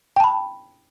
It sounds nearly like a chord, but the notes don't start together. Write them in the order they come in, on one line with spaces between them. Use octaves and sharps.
G5 A5 B5